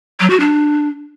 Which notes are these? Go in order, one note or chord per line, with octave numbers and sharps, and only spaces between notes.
F#3
F#4
D4